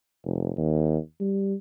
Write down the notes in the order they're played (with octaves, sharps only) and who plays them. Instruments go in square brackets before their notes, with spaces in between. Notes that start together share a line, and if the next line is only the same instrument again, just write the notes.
[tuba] F1
D#2
G3